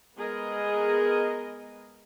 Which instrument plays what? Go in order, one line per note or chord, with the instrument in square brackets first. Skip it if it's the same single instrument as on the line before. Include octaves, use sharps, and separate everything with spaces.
[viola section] G#3 B3 G#4 A#4 D#5